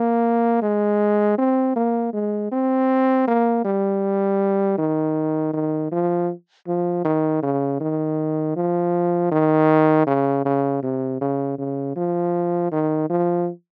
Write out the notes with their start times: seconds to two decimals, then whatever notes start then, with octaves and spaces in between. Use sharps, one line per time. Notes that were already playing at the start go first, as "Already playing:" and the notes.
Already playing: A#3
0.62 G#3
1.38 C4
1.76 A#3
2.13 G#3
2.52 C4
3.28 A#3
3.65 G3
4.78 D#3
5.54 D#3
5.92 F3
6.68 F3
7.05 D#3
7.43 C#3
7.81 D#3
8.56 F3
9.32 D#3
10.07 C#3
10.45 C#3
10.83 C3
11.21 C#3
11.59 C#3
11.96 F3
12.72 D#3
13.10 F3